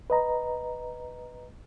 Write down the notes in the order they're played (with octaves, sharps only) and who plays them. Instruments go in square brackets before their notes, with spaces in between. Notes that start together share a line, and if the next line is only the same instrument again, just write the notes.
[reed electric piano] B4 D#5 A#5